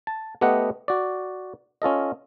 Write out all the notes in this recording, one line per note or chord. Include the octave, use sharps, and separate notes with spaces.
A5
A3 B3 G4 D#5 F#5
F#4 D5
C#4 F4 A4 D#5